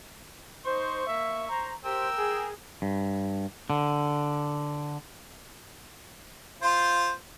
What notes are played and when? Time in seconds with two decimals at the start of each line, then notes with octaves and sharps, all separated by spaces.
0.66 D#4 C5 C#6
1.07 A#3 E5
1.49 C5 A#5
1.85 G4 A#4 C5 G5 E6
2.17 G#4
2.82 G2
3.70 D3
6.62 F4 C5